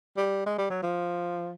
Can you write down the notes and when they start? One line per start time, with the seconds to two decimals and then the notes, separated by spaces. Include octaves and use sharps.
0.17 G3
0.46 G#3
0.58 G3
0.70 F#3
0.83 F3